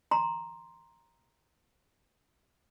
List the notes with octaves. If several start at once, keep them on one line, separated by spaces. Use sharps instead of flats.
A#5 C6